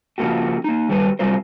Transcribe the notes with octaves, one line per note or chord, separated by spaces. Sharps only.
C#3 F3 G#3 A#3 F#4 G4
A#3 D#4
D#3 F#3 G3 F#4 G4 B4
C3 F#3 G3 F4 A#4 C5